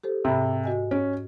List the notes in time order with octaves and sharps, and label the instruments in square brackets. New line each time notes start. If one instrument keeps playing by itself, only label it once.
[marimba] G4 A4 C5
[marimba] G#2 B5 [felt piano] C3
[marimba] F#4 D#5 G#5
[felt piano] C#4